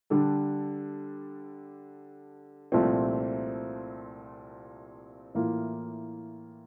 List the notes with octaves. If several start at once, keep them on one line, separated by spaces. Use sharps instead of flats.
D3 G3 D4 A4
C2 A#2 F3 A3 C4
A2 E3 A#3 F4